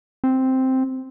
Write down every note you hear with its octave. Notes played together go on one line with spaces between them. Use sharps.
C4